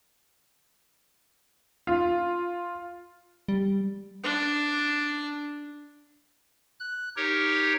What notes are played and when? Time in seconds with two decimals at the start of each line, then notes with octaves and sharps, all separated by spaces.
1.87 F4
3.48 G3
4.24 D4
6.80 F#6
7.16 D#4 G4 A#4 C#5